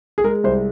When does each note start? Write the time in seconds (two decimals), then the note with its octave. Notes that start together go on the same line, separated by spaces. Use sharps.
0.18 G#4
0.24 G#3 A#4
0.44 C2 C5